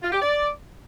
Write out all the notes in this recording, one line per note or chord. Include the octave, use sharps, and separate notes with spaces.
F4
G4
D5